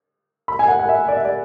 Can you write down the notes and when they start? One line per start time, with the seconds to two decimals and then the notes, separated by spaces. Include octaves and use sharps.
0.48 B5
0.59 G#5
0.68 F#5
0.79 F#5
0.89 E5
1.08 D5
1.17 E5
1.25 D5